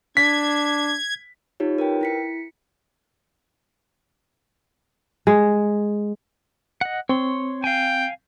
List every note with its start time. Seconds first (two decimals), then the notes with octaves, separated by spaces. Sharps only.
0.17 D4 G#6 B6
1.60 D#4 F4 G4 C#5
1.78 A#4 B4 G5
2.01 E4 B6 C#7
5.27 G#3
6.81 D#5 F#5
7.09 C4 C#5 C6
7.64 F5 G5 G#5